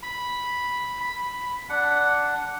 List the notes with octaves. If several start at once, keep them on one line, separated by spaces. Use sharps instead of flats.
B5
B5
D4 F#5